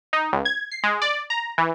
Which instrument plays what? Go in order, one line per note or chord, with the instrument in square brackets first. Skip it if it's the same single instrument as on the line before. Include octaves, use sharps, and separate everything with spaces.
[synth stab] D#4
C#2
G#6
C7
G#3
D5
A#5
E3